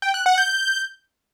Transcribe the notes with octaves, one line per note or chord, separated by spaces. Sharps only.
G5
F#6
F#5
G6